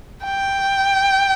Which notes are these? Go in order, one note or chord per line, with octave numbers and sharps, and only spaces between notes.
G5